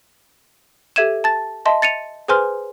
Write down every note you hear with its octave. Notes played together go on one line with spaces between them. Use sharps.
G4 A4 E5 G#6 D#7 E7
A5 A6
D#5 E5 A5 C6
A6 C#7 D#7 F7
G#4 B4 C5 G#5 C6 F6